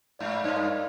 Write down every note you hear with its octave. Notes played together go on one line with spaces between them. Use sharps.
G#2 D5 F5
D5 F5
G2 C5 D#5
A#4 D5
D5 F5